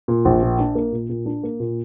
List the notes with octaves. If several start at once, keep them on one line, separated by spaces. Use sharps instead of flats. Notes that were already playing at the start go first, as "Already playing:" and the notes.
A#2
A#1
A#2
D4
A#3
A#2
A#2
D4
A#3
A#2